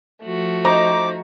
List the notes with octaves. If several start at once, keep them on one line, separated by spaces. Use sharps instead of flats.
F3 A3 F#4
D#4 C5 A#5 D6